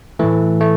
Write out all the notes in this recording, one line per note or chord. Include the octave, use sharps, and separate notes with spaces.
A2 E3 A3
A3